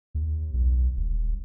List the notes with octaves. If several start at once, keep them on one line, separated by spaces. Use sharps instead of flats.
D#2
B1
D#1